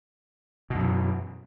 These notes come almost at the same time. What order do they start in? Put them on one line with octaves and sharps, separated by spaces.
B2 F#2 D3 E3